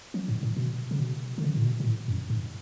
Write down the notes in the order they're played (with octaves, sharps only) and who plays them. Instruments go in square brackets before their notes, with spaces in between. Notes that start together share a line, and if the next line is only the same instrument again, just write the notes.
[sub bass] F3
G#2
A2
B2
C#3
B2
D3
C#3
A2
B2
B2
A2
F#2
G#2